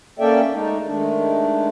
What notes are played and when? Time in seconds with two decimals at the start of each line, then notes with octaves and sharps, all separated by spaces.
0.19 A#3 C#4 A4 D5 E5 G5
0.52 G#3 A3 D#4
0.86 D#3 G#3 A3 D4